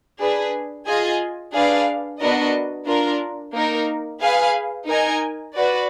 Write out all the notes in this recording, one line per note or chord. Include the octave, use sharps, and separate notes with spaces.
D4 G#4 B4
F4 G#4 D#5 G#5
D4 G#4 B4 D5 F5
B3 D4 F#4 A#4 D#5
D4 F4 A#4
A#3 D#4 A#4
G#4 B4 F5 G#5
D#4 A#4 D#5 G#5
F#4 B4 D5